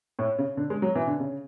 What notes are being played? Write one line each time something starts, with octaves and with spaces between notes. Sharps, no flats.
A2
C#3
D3
G#3
F#3
E3
D3
C#3